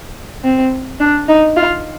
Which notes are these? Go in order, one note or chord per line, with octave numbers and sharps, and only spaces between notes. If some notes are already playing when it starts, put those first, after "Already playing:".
C4
D4
D#4
F4